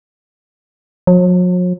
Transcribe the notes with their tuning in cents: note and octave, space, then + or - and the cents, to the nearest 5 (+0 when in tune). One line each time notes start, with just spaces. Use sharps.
F#3 -45